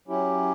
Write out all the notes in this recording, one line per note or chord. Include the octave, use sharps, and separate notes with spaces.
F#3 C#4 E4 G4